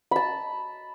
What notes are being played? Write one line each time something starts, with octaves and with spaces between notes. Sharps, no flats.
A5 B5